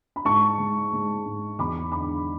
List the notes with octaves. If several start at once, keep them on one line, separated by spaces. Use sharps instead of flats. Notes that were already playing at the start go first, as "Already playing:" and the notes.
B5
G#2 A5 C#6
G#3
G#3
G#2
E2 B5 D6
D3 B5 D6